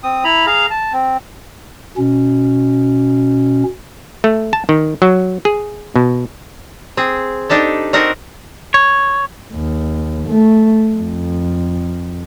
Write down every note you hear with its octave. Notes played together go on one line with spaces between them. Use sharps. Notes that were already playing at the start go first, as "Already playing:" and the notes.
C4 D#6
E4 A#5 B5
G#4 F5 A#5
A5
C4
B2 C#4
A3
A5
D#3
F#3
G#4
B2
C4 G#4
D4 D#4 G4 A4
C4 D4 D#4 F#4 A#4 F#5
C#5
D#2
A3
F2